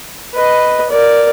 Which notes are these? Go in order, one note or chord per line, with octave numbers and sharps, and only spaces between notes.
B4 D#5
A#4 D5